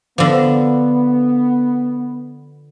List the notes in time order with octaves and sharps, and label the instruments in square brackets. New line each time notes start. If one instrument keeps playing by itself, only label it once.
[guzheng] D3 F3 [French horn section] B3